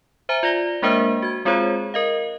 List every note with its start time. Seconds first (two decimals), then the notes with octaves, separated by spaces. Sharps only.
0.29 C5 E5 G#5 A#5
0.43 F4 D5 A#6 G7
0.82 G#3 A#3 D4 A#4 C5 E5
1.22 F#4 G#6
1.45 G#3 C4 F4 G#4 C5 C#5
1.94 A#4 D#5 F5